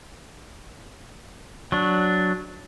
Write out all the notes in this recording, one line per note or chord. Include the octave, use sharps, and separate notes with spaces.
F#3 D4